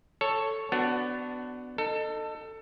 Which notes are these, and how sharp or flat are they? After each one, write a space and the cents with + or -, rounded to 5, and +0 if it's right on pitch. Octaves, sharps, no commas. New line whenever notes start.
A4 +5 C#5 +0
B3 +20 D4 +0 F#4 +0
D#4 -20 A4 +20